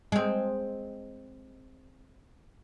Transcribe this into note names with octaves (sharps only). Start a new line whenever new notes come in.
G#3 C4